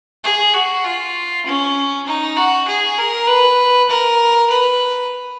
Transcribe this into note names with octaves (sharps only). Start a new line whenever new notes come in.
G#4
F#4
F4
C#4
D#4
F#4
G#4
A#4
B4
A#4
B4